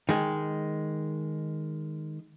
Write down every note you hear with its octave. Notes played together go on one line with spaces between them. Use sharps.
D#3 G#3